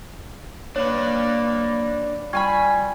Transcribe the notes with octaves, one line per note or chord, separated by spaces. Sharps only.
A#3 D4 B4 C#5
G3 F4 G5 G#5 B5 C#6 G#6